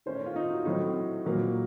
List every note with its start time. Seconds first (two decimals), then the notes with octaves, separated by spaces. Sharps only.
0.06 D#3 A3 C#4 C5
0.16 C#5
0.26 F4
0.36 D#4
0.51 F#4
0.65 A2 F#3 C4 D#4
1.25 A#2 F#3 A#3